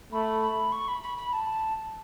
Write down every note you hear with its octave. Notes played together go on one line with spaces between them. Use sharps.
A3 B5
B5
C#6
B5
B5
B5
A5